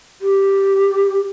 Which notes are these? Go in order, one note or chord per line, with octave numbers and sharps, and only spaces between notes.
G4